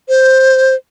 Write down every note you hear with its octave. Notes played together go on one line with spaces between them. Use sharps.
C5